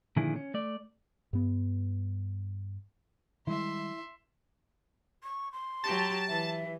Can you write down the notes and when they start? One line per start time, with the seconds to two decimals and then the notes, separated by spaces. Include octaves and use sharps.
0.17 A#2 D3 D#3 F3 E4 G#4
0.36 C#4
0.54 A3 D5
1.33 G2 B3
3.47 D#3 G3 G#3 E4 E5 C6
5.23 C#6
5.53 C6
5.84 F#3 G4 A5
6.28 E3 E5